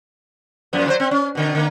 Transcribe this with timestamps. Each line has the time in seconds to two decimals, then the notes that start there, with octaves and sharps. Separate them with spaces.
0.73 F#2 F3 B3
0.86 E3 F#3 C5
1.00 C4
1.11 C#4
1.35 B2 D3
1.55 D3 A#3